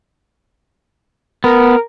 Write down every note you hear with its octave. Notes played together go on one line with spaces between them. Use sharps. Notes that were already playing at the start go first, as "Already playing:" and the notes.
B3 A#4